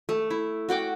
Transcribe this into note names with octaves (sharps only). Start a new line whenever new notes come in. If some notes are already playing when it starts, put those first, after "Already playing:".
A3
E4
F#4 F#5 G5 D6